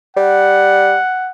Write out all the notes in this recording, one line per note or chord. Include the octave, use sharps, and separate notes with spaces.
G3 F#5